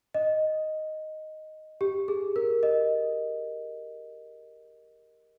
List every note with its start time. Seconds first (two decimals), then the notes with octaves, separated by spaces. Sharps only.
0.14 D#5
1.81 G4
2.08 G#4
2.36 A#4
2.63 D#5